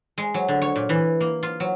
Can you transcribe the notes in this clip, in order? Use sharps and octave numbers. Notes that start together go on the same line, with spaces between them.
G#3
F#3
D3
C#5
A#2
E3
A#3
F4
F#3